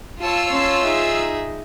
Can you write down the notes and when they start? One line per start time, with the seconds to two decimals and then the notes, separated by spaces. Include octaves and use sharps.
0.22 F4 C#5 A5 E6
0.52 C#4 C#5 A5 C6
0.83 D#4 G#4 E5